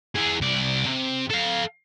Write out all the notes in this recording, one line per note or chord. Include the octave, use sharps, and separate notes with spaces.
E4 G#4
C2 D5
C3
A4 F5